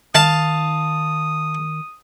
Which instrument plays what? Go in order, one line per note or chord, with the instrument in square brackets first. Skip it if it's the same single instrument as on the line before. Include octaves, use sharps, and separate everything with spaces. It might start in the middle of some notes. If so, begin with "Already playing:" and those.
[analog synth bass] D#3 [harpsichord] F5 A5 [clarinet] D#6